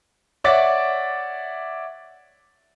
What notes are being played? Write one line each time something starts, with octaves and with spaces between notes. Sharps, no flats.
C#5 D5 E5 F#5 D6 A6